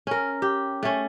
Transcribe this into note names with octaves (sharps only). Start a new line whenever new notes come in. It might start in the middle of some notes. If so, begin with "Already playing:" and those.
C#4 A#4
G4
A3 C#4